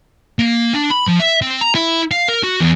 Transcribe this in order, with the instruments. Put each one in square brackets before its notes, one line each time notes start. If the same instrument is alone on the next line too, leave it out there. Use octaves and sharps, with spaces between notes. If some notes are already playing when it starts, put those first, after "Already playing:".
[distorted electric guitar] A#3
D4
B5
F3
E5
C4
A#5
E4
F5
A#4
F#4
E2